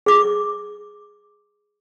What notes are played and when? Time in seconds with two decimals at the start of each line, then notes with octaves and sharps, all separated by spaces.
0.06 G#4 D6